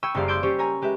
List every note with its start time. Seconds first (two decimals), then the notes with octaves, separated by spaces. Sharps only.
0.03 G5 B5 C#6 D#6 E6 G#6
0.14 F#1 G3 A#3 C5 D5 F5
0.28 C6 D6 E6 G6 G#6 D7
0.43 G3 C#4 G4 C5 C#6
0.59 A#4 C#5 G#5 A#5
0.82 G#3 G4 B4 E5